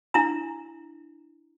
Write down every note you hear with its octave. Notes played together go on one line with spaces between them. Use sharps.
D4 E4 A#5